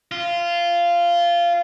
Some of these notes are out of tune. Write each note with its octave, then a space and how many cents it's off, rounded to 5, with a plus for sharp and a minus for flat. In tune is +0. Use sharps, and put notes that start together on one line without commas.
F4 -15